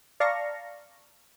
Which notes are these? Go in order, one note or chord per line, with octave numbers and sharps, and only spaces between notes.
D5 F5 A5 A#5 C#6 A#6